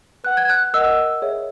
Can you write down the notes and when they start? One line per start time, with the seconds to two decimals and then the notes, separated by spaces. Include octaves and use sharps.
0.24 B4 F#5 F#6
0.37 G#6
0.50 F#6
0.73 A#4 D#5 F#5 E6
1.22 G#4 C#5 E5